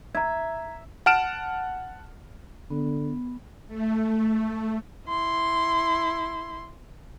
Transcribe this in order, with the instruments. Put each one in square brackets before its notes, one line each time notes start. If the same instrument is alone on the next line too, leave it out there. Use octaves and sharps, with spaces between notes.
[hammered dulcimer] E5 [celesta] A#5 G#6
[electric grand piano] F#5 A5 F6 D7 E7
[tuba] D3 [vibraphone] B3
[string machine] A3
[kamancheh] E4 C6